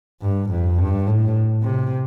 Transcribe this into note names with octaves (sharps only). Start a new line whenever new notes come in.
G2
F2
G2
A2
C3